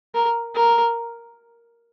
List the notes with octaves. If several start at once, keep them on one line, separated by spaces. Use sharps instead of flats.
A#4
A#4